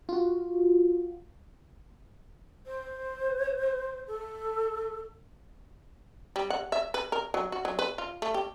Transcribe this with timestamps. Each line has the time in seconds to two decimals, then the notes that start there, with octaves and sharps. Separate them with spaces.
0.09 F4 F#4
2.66 C5
4.08 A4
6.36 G3
6.50 F#5
6.72 E5
6.94 B4
7.12 A#4
7.34 F#3
7.52 F#4
7.65 F#3
7.79 B4
7.98 F4
8.22 A3
8.34 G4